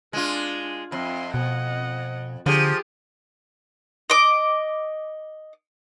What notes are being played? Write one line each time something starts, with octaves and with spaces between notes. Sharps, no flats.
G#3 D4 F4
F2 E5 C6
B2 D#5 F#5
D3 F3 G4 G#4
D#5 D6